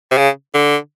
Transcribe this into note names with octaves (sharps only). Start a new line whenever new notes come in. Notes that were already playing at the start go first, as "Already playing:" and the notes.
C3
C#3
D3